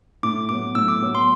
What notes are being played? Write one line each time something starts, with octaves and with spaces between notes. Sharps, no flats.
A2 D6
F#3 B3 D6
A2 E6
D6
F#3 B3
C6